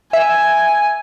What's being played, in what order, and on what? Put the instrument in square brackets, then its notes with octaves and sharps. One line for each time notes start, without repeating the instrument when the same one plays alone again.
[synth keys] E5 [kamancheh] G#5